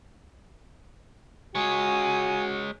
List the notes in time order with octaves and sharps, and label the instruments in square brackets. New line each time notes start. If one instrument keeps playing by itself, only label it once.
[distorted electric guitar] G#3 C#5 [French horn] F#4 [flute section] G#5 D#6